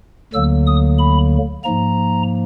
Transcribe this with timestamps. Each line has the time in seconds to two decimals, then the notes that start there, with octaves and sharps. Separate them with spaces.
0.34 D2 D3 F#3 A#3 E6
0.67 D#6
0.99 B5
1.64 G#2 F3 A#3 A#5